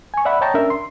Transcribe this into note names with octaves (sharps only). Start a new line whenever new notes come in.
G#5 C#6
D5 E5 F#5 B5
C#5 D#5 G5 A5 A#5 C#6
C#4 D4 A#4 E5
C6